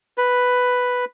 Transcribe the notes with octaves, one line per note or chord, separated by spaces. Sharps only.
B4